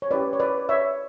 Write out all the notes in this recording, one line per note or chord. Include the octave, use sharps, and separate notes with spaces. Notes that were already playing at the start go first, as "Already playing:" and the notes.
C#5
C#4 E4 G4 B4 D5
C#5
B4 D5
C#5 E5